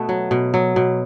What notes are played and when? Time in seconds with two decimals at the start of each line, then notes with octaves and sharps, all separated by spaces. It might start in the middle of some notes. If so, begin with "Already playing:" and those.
Already playing: B2 A3 B3
0.09 F#3
0.31 B2
0.54 F#3
0.76 B2